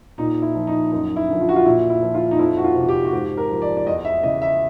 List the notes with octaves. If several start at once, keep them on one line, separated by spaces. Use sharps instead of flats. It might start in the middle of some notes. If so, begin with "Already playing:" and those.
A#2 D#4
E4
F3
D#4
F#2 D#4
E4
D3 F3
F4
F#4
F4
A#2 E4
E4
F3
F4
D#4
F2 E4
F#4
F4
C3 E3
G4
F#4
G#2 G4
A#4
F3
D5
D5
E2 D#5
E5
C#3 E3 D#5
E5